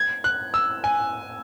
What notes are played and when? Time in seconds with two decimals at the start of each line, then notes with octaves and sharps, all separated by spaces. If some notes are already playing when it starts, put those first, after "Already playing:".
Already playing: G#6
0.24 F#6
0.54 E6
0.84 G#5